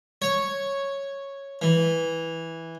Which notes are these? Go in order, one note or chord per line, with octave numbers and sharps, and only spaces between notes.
C#5
E3